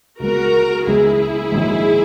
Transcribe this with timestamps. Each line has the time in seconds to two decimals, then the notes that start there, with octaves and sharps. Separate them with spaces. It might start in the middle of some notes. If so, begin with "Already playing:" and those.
0.20 C#2 C#3 F#3 B3 F#4 A#4
0.86 C#2 C#3 F#3 B3 E4 G#4
1.52 A#1 G#2 D#3 F#3